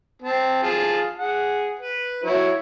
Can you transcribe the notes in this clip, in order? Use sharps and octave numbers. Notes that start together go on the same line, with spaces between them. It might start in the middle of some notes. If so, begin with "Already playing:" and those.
C4 A5
F4 G#4 A5
G#4 F#5
B4
F#3 E4 C#5